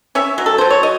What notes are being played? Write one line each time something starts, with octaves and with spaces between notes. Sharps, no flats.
C#4 C#5 E5
F#3
A4
F#3 C5
C#5
D#5